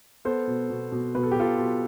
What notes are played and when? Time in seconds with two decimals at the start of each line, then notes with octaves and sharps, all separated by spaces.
0.25 B3 A4 C5
0.47 B2
0.70 B2
0.92 B2
1.15 B2 B4
1.23 A4
1.31 G4
1.36 B2 F4 A4
1.59 B2